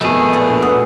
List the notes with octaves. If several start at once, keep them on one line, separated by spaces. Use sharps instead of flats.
F2 B2 D#3 G#3 A3 G#4
A#2 E3 A#3
A#1
B4 F#5 D#6